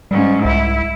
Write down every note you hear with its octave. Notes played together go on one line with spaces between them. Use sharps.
G#2 G3 C#4
C2 E4